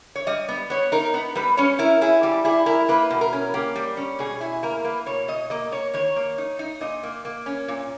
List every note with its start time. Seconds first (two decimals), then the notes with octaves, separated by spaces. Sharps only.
0.16 C#5
0.27 G3 D#5
0.49 B3
0.70 B3 C#5
0.92 D#4 A#4
1.14 B3
1.35 G3 B4
1.57 C#4 C#5
1.79 E4 A#4
2.01 E4 G#4
2.23 G3 G4
2.45 E4 G#4
2.66 E4 A#4
2.89 A#3 B4
3.10 B2
3.21 A#4
3.33 C#4
3.54 A#3 G4
3.76 G3
3.97 C#4
4.19 B2 G#4
4.41 E4 G#4
4.63 A#3 A#4
4.84 A#3 B4
5.06 B2 C#5
5.28 B2 D#5
5.50 A#3 D#5
5.71 A#3 C#5
5.94 D#3 C#5
6.16 A#3
6.38 D#4
6.59 D#4
6.81 A#2 D#5
7.03 A#3
7.25 A#3
7.46 C#4
7.68 A#2